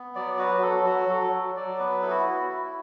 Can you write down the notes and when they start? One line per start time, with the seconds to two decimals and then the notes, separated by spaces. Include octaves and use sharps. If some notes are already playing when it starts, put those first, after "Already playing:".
Already playing: B3
0.15 F#3 D5
0.34 D5
0.38 F#4 B4
0.55 F#4
0.62 F#3 A4
0.85 F#3 F#4
1.09 F#3 A4
1.32 F#3
1.56 F#3 D5
1.79 B3 B4
2.02 E4 A4
2.10 F#4
2.26 E4
2.50 E4